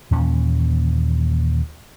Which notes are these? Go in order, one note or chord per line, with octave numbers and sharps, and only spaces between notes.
D#2 A#2 E3 C#4